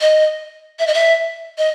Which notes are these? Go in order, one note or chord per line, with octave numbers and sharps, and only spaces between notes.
D#5
E5
D#5
E5
D#5